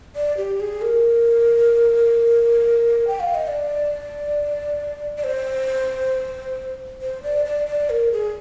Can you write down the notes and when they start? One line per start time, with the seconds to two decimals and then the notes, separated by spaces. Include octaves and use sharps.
0.16 D5
0.37 G4
0.60 G#4
0.81 A#4
3.07 G5
3.20 F5
3.35 D#5
3.47 D5
5.18 D5
5.24 C5
7.02 C5
7.23 D5
7.46 D5
7.67 D5
7.90 A#4
8.12 G#4